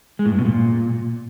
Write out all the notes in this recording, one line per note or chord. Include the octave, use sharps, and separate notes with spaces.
G#3
A2
G2
B2
A#2